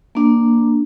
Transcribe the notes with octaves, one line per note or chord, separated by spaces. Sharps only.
A#3 D4